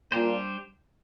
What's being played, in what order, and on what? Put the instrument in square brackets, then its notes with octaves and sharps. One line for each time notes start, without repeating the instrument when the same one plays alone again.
[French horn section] A#2 [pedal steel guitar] G3 D4 G4 C5